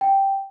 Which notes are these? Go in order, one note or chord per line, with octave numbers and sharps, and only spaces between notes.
G5